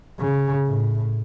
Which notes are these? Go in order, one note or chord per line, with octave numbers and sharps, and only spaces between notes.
C#3
A2